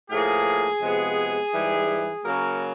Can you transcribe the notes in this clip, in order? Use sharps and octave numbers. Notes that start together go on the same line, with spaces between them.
A2 F3 A#3 G#4
C3 F3 G#3 B3
G#2 E3 G3
C#3 F#3 A#3 A#4